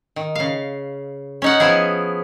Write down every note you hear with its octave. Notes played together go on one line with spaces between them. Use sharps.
D#3
C#3 F5
C#4 D#4 F#5
F3 B3 E4 G#4